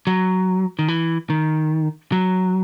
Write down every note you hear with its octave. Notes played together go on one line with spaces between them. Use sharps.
F#3
D#3
E3
D#3
F#3